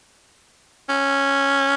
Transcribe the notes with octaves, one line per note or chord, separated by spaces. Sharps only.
C#4